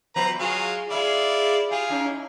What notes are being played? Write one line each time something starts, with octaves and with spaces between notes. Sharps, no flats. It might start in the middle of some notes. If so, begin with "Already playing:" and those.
F3 B3 B4 C5 A#5
F#3 G#3 F4 G#4 F5
G#3 E4 F4 G#4 D5
F4 G4 G#4
C#4 D#4 E4